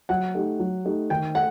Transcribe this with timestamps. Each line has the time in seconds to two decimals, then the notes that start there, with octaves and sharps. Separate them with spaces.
0.09 F#3 F#5
0.35 A3 D#4 G4
0.60 F#3
0.85 A3 D#4 G4
1.10 D#3 G5
1.35 A3 F#5